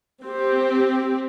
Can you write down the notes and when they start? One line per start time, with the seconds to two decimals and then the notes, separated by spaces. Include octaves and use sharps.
0.23 C4 G4